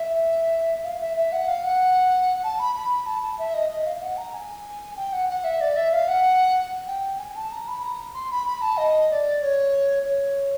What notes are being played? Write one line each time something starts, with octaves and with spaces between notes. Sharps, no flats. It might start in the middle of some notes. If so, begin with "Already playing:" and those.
Already playing: E5
F5
E5
E5
F#5
F5
F#5
A5
B5
B5
A5
A5
E5
D#5
D#5
F5
F#5
A#5
G#5
G5
F#5
F#5
E5
D5
E5
F5
F#5
G5
G#5
A5
A#5
B5
A#5
C6
B5
B5
A5
D#5
D5
C#5
C#5